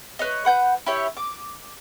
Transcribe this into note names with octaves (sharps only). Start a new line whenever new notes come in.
B4 C#5 D#5
B4 F#5 G6
E4 G4 C#5
D6